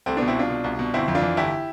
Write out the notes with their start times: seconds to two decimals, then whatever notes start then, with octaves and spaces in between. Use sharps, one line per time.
0.06 C2 A3 C4
0.17 B2 B3 D4
0.28 C4 E4
0.35 C2 D4 F4
0.50 B2
0.64 C2
0.79 B2
0.94 G1 C4 E4
1.08 F2
1.15 D4 F4
1.22 E3
1.37 G1 E4 G4